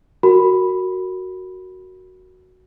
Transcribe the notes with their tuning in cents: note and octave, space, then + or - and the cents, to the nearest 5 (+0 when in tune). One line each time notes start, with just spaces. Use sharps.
F#4 +0 A#4 -15 B5 +0